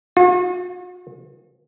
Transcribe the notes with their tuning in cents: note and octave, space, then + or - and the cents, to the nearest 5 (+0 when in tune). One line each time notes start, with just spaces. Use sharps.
F#4 -45